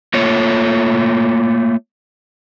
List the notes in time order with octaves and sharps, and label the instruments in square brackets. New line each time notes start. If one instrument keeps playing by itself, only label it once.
[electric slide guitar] A3 A#3 F4 C#5